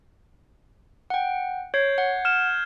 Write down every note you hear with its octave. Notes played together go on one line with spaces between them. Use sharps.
F#5 G5
C#5 G6 G#6 C7
F#5
F6 E7